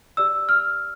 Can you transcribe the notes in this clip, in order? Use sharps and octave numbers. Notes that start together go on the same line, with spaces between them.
G4 D5 E6
F6